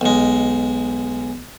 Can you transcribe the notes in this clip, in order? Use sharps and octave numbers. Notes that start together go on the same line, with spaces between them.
B1 G#3